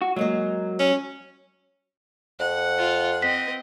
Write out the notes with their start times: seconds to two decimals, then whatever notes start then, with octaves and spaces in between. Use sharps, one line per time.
0.02 F#4
0.16 F#3 G#3 A#3 D#5
0.79 C#4
2.39 F2 F#5
2.79 F4
3.22 C4 D#5 B6